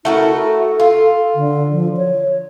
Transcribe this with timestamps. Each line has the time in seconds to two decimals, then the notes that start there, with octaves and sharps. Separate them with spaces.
0.05 A3 E4 F#4 A#4
0.32 A4
0.80 F4
1.35 D3
1.72 F3
1.97 C#5